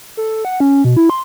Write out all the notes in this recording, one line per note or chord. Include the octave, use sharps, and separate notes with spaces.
A4
F#5
C#4
B2
E4
C6